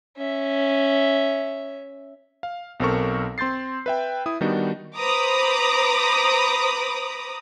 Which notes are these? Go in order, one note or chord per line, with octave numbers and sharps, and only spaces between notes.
C#4 E5
F5
B1 C4 A4 A#4 C#6
C4 C6 G6 A6 C7
B4 E5 G5
E4 D#6
D#3 G3 B3 D4 D#4 F#4
B4 C5 A#5 B5 D6 D#6